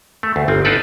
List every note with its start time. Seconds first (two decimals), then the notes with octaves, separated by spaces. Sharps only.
0.23 A3
0.36 D2
0.48 G1 C4
0.65 D#4 F4 A4 B4 D5